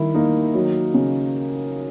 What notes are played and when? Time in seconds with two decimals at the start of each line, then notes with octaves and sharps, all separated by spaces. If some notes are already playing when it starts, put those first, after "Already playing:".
Already playing: D#3 G3 E4
0.15 A#3 D#4
0.55 F#3
0.94 C#3